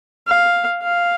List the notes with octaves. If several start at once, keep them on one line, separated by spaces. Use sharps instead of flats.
F5
F5